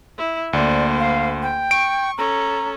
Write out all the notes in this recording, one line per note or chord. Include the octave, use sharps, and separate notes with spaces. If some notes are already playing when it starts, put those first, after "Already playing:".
E4
D2 A#3 C5 D5
F5
G5
C#6 D7
C#4 A4 A#5